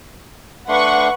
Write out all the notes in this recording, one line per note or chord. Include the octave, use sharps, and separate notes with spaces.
A3 D4 B4 F#5 C6 C#6